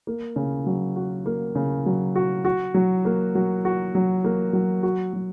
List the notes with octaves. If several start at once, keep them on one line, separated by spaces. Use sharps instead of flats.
A#3
C#3
F#3
F#4
A#3
C#3
F#3
F#4
F#4
F#3
A#3
F#3
F#4
F#3
A#3
F#3
F#4
F#3